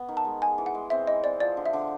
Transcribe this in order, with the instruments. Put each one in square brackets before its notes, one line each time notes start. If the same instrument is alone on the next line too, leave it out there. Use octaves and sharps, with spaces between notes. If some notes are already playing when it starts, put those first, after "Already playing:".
Already playing: [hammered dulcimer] B3
D#3
[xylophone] A5
[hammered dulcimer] G#3
[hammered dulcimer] G#3 [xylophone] G#5
[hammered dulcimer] E3
[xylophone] F#5
[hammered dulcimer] G#3
[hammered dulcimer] C4 [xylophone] E5
[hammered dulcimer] E3 [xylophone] D#5
[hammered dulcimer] C4 [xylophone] D5
[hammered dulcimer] F3 [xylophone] D5
[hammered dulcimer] D3
[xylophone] E5
[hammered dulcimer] D3